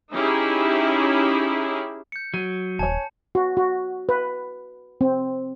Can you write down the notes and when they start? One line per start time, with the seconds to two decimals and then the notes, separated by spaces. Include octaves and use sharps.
0.13 C#4 D#4 E4 G4 G#4 E5
2.12 G6 C#7
2.34 F#3 D#7
2.79 D#1 C#5 G#5 A5
3.35 F#4
3.57 F#4
4.09 B4
5.01 C4